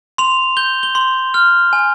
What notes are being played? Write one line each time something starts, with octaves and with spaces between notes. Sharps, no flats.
C6 F7
G6 G7
G7
C6
F6
G#5